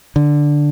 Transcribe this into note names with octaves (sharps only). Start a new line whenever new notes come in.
D3